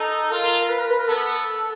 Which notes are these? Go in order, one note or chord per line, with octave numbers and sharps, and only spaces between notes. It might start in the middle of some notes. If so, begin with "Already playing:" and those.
Already playing: D#4 A4
F4 A#4
A#4
B4
A#4
B4
A#4
B3 A4